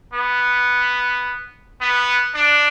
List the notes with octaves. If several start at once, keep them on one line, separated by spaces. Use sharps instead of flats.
B3
B3
D4